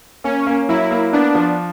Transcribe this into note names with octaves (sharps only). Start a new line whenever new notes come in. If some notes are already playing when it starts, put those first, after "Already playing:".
A#3 C#4
A#3
F#3 E4
A#3
B3 D4
F3